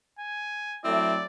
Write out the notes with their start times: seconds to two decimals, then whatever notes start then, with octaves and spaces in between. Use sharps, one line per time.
0.19 G#5
0.85 F#3 A3 C4 E4 D5